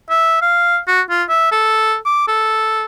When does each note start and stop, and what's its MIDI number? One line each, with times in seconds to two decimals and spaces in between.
0.10 0.41 76
0.42 0.78 77
0.87 1.01 66
1.10 1.23 65
1.29 1.47 76
1.52 1.95 69
2.05 2.26 86
2.28 2.85 69